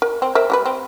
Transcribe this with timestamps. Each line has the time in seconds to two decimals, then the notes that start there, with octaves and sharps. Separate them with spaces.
0.02 A#4
0.22 C4
0.35 A#4 C5 E5
0.50 G3 G4 B4
0.66 C4